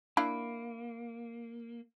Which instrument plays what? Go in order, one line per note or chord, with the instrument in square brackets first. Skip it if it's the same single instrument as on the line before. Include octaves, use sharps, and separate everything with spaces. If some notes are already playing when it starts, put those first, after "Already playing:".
[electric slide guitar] A#3 [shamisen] D4 E4 F5